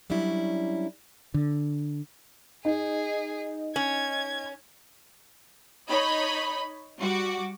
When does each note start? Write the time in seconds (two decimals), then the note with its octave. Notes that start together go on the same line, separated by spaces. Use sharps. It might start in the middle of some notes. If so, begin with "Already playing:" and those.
0.10 F#3 G3 C#4 D4 E4
1.34 D3
2.65 D#4 G#4
3.76 C#4 G#6
5.89 D#4 C#5 D#5 B5
6.99 G3 F#4 D6